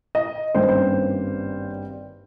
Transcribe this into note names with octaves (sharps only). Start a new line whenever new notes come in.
D#5
G#1 G2 G3 A#3 C#4 C5
C5